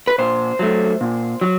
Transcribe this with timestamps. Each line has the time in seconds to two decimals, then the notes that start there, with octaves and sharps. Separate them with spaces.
0.07 B4
0.18 A#2 C5
0.59 F#3 A3
1.01 A#2
1.41 F#3